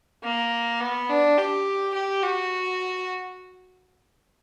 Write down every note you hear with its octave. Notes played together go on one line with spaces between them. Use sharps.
A#3
B3
D4
G4
G4
F#4